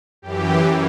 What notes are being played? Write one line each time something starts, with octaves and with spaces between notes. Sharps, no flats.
F#2 E3 G4